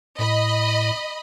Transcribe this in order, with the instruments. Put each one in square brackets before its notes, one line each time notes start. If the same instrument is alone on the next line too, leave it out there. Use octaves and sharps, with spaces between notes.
[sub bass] A2 [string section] D#5 B5